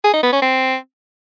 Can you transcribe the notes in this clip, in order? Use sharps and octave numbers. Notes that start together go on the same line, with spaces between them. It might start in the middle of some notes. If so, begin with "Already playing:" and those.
G#4
D#4
B3
C#4
C4